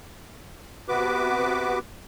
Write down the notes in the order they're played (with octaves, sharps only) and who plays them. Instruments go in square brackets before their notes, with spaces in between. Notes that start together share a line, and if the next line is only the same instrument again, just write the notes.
[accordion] C3 B3 F#4 B4 D6